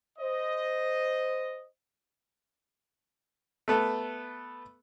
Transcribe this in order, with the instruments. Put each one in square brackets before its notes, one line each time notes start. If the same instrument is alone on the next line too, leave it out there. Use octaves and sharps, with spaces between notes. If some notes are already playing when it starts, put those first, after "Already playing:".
[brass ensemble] C5 D#5
[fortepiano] A3 B3 A4